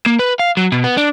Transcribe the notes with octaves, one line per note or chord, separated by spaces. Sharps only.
A#3
B4
F5
F#3
B2
B3
D4